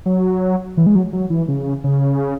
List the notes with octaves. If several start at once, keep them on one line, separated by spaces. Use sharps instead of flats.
F#3
E3
G#3
F#3
F#3
E3
C#3
C#3